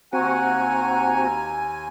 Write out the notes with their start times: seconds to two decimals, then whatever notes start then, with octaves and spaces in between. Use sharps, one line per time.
0.13 D#2 C4 F#4 F#5 G#5 A#5